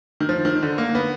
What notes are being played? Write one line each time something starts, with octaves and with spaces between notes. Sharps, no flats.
D#3
F3
D#3
D3
A#3
B3